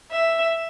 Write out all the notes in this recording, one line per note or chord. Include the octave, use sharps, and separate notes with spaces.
E5